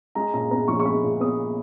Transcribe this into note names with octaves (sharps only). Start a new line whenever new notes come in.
G#3 A#5
A#2 A#5
B3 A#5
A#1 C#6
C#6
G#3 B5
A#2
B3 D#6